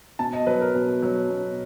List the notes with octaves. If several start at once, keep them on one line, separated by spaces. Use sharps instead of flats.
B2 A5
D#5
F#3 B4
A#4
B2
F#3
B2